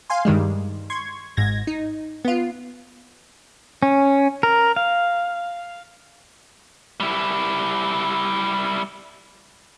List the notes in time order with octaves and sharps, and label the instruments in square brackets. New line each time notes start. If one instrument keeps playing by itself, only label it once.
[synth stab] F5 G#5 C6
G2 D#3 G3 G#3
C6 C#6 G#6
G#1 G#2 G#6 A#6
D#4
B3 F4
[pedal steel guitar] C#4
A#4
F5
[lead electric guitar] G3 E4